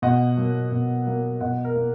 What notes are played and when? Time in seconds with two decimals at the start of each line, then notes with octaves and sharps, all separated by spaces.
0.02 B2 D#5 F#5
0.37 F#3 A#3
0.72 B2
1.06 F#3 A#3
1.40 B2 D#5 F#5
1.64 A#4
1.75 A#3